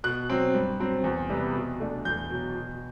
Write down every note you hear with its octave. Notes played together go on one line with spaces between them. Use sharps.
B2 F#6
F#3 C4
G2
F#3 C4
E2
C3 G3 B3
B2
A3 D4
E2 G6
B2 F#3
B2